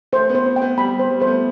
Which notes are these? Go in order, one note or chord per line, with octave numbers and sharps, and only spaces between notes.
A3 C5
B3
C5
C4
G5
B3
G3 B5
G3
C5
G3
A3 C5
B3